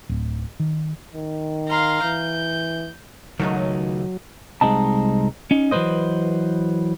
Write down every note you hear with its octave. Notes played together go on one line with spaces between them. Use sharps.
D1
D#3
D#3
F5 A#5 C6
E3 G6
C#2 D#3 F#3 A3 D#4
C2 C#3 G#3 C4 D#4 A5
C#4 D#4
E3 F#3 A#3 B4 C5 D#5